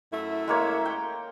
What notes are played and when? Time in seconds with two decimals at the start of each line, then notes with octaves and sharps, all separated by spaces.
0.12 F#2 A3 E4
0.48 G#3 A#3 C#5
0.86 G5